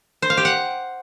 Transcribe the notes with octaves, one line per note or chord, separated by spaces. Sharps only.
C5
F5
G4
F#5